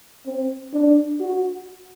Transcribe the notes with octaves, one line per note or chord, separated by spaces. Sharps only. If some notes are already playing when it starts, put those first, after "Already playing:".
C4
D4
F#4